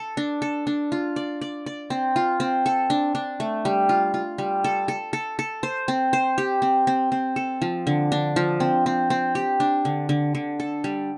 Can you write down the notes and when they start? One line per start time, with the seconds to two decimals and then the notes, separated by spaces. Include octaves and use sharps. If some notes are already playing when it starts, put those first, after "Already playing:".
Already playing: A4
0.17 D4
0.42 A4
0.67 D4
0.92 F4
1.16 D5
1.41 D5
1.66 D5
1.90 C4
2.16 F4
2.40 C4
2.66 A4
2.90 D4
3.15 D4
3.40 A3
3.65 G3
3.89 F4
4.14 F4
4.38 G3
4.64 A4
4.88 A4
5.13 A4
5.39 A4
5.63 C5
5.88 C4
6.13 C5
6.38 G4
6.62 C4
6.87 C4
7.12 C4
7.36 A4
7.62 F3
7.87 D3
8.12 D4
8.36 F3
8.60 C4
8.86 C4
9.10 C4
9.35 G4
9.60 D4
9.85 D3
10.09 D3
10.35 D3
10.60 A4
10.84 G3